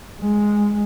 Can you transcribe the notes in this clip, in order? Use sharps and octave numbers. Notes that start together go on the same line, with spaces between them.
G#3